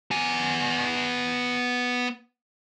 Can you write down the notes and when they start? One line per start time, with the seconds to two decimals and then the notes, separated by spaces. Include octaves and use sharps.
0.11 B3 G#5